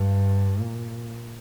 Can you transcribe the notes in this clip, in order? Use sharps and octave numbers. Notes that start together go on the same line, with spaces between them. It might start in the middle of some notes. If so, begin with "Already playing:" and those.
Already playing: G2
A#2